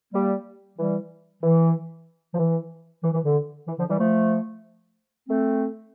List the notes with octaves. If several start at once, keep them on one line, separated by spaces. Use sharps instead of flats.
G3 A#3
E3 G3
E3
F3
E3
E3
E3
D3
E3
D3 F3
E3 G3
F3 A3
A3 C4